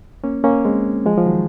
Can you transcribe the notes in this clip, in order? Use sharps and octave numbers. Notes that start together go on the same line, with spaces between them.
A#3 C#4
A#3 C#4
G#3 C4
F3 G#3
F3
D#3 F#3